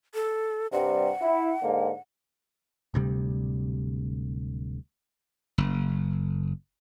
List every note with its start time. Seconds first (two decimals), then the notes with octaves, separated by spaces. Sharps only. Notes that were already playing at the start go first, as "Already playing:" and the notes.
0.14 A4
0.72 G2 C3 G3 F#5
1.22 E4
1.62 G#2 D3 A#3
2.94 D1 D2 C3 G3
5.58 F#1